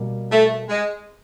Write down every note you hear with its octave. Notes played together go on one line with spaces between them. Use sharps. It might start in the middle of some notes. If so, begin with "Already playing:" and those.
Already playing: B2 G3 A#3
A3
G#3